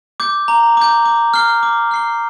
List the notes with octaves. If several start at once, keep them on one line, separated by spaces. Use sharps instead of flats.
D6 G6
A#5
D6 G6
D6
F6 C7 G7
D6
F6 C7 G7